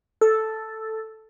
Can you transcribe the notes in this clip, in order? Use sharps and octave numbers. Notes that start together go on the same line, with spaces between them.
A4